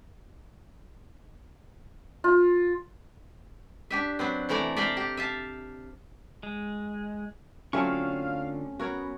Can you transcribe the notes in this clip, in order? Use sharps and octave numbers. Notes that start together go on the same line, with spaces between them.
F4
D4 G4 E5
F#3 B3 C4
C3 E3 A3 D5 A#5
D5 E5 F5 G5 A5 A#5
G4
E5 F5 A5
G#3
D3 F#3 A3 C4 C#4 F4 F5 C#6
B3 F#4 A#4 C#5